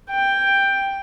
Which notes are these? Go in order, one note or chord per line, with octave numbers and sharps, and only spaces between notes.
G5